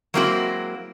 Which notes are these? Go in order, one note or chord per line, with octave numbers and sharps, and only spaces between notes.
F#3 G#3 A#3 C4 E4 F#4